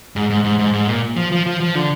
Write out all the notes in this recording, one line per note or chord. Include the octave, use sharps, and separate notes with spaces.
G#2
G#2
G#2
G#2
G#2
A#2
F3
F3
F3
F3
D3